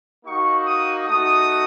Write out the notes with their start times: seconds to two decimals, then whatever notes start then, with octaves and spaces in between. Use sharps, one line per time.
0.25 A#3 D#4 F#4 C#6
0.65 D#6
1.07 A3 D#4 F#4 D#6